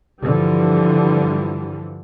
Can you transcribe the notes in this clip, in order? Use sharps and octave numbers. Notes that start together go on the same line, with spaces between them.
G2 D3 E3 F3 G3